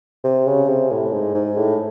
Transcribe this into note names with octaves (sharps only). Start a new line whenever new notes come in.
C3
C#3
C3
A2
G#2
G#2
A2